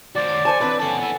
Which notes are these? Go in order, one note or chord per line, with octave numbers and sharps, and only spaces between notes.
F#4 C5 D5
C#5
A4 C5 G#5 A5
E3 C4 D4 B4
F#4 A4 F#5 G#5 A5
B3 E4